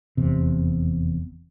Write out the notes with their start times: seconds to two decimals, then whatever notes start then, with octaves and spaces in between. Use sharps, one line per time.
0.17 F1 E2 C3